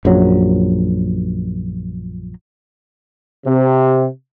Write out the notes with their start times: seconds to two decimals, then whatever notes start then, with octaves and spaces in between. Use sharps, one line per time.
0.05 A#1 F#2 F#3
3.47 C3